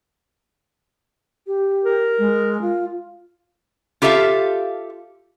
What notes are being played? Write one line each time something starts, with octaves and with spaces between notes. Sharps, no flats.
G4
A#4
G#3
F4
F4 G4 A4 E5 F5